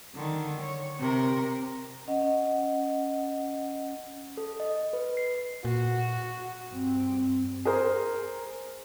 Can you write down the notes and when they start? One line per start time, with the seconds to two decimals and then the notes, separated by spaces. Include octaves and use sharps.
0.14 D3 D#3
0.60 C#5
0.99 C3 A#4
2.08 C#4 D#5 F#5
4.37 A4
4.60 D#5
4.93 B4
5.17 C7
5.65 A#2 F#4
6.70 G2 C4
7.65 G#4 A#4 C5